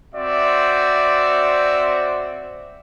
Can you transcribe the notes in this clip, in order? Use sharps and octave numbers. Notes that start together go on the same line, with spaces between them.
C4 F#4 C5 D5 E5